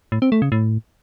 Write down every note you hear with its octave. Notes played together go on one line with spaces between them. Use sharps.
A2
C4
A3
C#3
A2